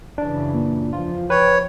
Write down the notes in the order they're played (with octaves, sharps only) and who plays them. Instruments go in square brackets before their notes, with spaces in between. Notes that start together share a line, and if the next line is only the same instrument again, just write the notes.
[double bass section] F#2 C#3 E3 [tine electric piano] D4
[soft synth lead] A#2
[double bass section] E2 F3 [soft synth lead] F4
[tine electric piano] B4 [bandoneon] C#5 [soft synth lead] G5